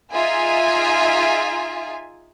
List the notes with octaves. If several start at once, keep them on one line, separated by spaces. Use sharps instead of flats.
D#4 F4 G#4 E5 G#5